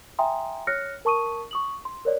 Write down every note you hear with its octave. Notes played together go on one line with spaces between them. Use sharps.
E5 G5 G#5 A#5 C6 D#6
C#5 F6 F#6 A#6 C#7
A#4 A5 C#6 D#6 D#7
C#6 D#6 F#7
C6
A#4 C#5 D5